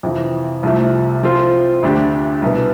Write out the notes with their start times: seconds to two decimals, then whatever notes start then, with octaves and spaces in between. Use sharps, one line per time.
0.03 F2 C3 E3
0.63 C2 C3 F3 A3
1.23 F3 C4 F4 A4 C5
1.82 D2 D3 A3 D4 G4
2.42 C2 B2 B3